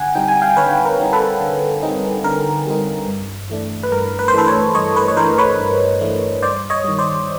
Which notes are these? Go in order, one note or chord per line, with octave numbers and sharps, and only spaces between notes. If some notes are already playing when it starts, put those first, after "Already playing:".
Already playing: D3 F#5 G#5
G3 C4 D#4 G5
G#5
F5 G5
D3 B4 C#5
A#4
G3 C4 D#4
A4 B4
D3
G3 C4 D#4
D3 A#4
G3 C4 D#4
G2
E3 A3 D4
B4
G2 A#4
B4
C5
E3 A3 D4 A4 B4
B4 C#5
G2 C#5 D#5
B4 C#5
C#5
E3 A3 D4 A#4 C5
B4 C#5
G2
E3 A3 D4
G2 C5 D5
C#5 D#5
D#3 G3
C5 D5